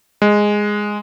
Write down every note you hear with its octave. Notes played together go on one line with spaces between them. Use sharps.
G#3